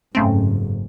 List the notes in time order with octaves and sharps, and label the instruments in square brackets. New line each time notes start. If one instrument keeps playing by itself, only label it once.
[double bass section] F#1 G#2 [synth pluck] C#3 A3 C4